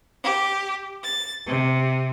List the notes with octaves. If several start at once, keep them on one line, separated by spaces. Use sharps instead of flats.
G4
A6
C3